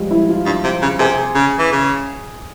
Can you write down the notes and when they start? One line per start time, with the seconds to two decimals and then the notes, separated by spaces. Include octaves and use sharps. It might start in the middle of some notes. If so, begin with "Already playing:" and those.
Already playing: F3 G3 G#3
0.11 E4
0.29 F4
0.46 G2
0.64 C3
0.82 C#3
0.99 C3 G#4
1.35 C#3
1.59 E3
1.72 C#3